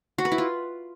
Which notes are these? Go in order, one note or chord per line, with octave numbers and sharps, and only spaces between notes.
F#4
B4
E4
F4